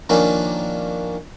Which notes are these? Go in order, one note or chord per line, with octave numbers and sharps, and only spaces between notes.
D#3 F3 A#3 C#4 D4